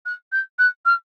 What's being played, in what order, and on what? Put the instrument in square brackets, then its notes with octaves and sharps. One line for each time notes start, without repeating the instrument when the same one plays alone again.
[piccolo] F#6
G6
F#6
F6